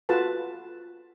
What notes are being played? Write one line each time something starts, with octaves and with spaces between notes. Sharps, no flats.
F4 F#4 A4 B4 A5